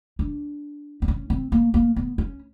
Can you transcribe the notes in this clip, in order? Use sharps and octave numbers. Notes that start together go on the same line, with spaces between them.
D4
C4
C#4
C4
A#3
A#3
B3
C#4